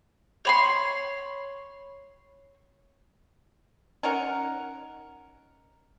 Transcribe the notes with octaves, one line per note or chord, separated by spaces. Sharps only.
C#5 B5 C6
C#4 D#4 A#4 F#5